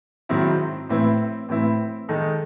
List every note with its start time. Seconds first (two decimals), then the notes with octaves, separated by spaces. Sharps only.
0.29 G#2 D#3 F#3 C4 E4
0.89 A2 E3 C4 E4
1.49 A2 E3 C4 E4
2.08 D#3 G#3 D#4 A4